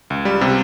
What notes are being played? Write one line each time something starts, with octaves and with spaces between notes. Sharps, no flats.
C#2
G3
C3